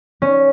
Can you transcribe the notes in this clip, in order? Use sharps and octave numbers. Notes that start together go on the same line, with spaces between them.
C#4